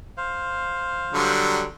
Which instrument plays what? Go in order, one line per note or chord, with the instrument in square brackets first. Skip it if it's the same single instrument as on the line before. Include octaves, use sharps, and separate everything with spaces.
[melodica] C5 F5
[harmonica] D3 F#3 G3